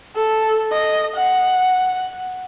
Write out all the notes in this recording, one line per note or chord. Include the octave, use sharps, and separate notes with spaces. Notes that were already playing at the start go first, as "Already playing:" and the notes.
A4
D#5
F#5